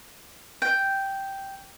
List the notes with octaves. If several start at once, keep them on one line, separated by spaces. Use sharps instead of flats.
G5